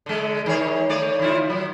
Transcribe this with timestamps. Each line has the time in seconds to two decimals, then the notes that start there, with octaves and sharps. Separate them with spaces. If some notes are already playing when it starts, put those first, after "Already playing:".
0.06 D3 G#3
0.46 D#3 C#5
0.89 A3 C#5 D5
1.19 D#3 E4 F4
1.50 F#3